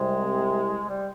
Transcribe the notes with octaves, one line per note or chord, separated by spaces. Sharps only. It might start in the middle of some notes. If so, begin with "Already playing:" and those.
Already playing: C2 C3 G#3
G3